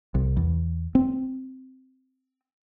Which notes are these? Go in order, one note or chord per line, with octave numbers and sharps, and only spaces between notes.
C2
E2
C4